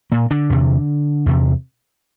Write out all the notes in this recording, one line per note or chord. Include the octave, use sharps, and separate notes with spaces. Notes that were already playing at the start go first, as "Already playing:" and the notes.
A#2 A#3
D3 D4
E2 C3
E2 C3